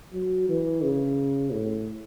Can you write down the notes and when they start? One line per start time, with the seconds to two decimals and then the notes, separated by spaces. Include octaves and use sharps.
0.13 F#3
0.48 E3
0.83 C#3
1.52 A2